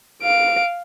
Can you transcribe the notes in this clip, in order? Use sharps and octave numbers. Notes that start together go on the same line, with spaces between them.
F5 D7